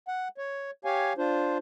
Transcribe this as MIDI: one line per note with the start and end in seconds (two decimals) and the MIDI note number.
0.08 0.28 78
0.38 0.71 73
0.85 1.13 67
0.85 1.13 73
0.85 1.13 77
0.85 1.13 80
1.18 1.58 62
1.18 1.58 65
1.18 1.58 72